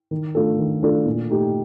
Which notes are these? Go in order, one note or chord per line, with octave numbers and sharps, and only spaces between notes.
D#3
A3 D4 F4 A4
D#3
A3 D4 F4 A4
A#2
A3 D#4 G4